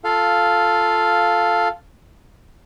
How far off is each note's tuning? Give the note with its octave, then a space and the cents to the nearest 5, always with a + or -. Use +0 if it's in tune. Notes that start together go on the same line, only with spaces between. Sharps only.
F4 +0 A4 +0 F5 +0